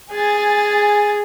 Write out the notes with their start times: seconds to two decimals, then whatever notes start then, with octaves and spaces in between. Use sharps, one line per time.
0.13 G#4 G#5 A6